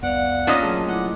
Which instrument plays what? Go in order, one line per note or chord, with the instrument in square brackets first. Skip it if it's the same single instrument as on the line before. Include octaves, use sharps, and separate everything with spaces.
[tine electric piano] C2 F2 B3 [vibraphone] D5 F5 [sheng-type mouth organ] F#5
[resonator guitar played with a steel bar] A#2 C#4 D#5 [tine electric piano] F6 A6
[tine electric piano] F#3 A3 G#4 [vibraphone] A5
[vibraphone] E4 D6 [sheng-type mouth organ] F#5